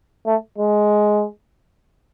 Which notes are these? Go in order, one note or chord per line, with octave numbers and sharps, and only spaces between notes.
A3
G#3